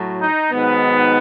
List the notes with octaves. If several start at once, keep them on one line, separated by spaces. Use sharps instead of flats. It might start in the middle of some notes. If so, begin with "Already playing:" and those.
Already playing: A2 F#3
D#4
G#2 D#3 F#3 B3